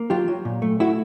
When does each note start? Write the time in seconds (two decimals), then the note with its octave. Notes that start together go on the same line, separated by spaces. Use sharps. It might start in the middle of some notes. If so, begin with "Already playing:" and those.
Already playing: A#3
0.10 F#3 F4 G4
0.28 F#3
0.45 A#2
0.62 A3
0.80 A3 E4 F#4